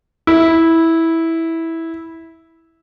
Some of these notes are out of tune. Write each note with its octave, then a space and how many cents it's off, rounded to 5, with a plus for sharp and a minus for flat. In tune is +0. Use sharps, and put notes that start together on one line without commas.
E4 -10